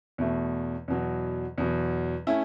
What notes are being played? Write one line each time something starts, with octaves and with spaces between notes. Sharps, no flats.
E2 B2 A3
E2 B2 F#3
E2 B2 F#3
A3 C#4 E4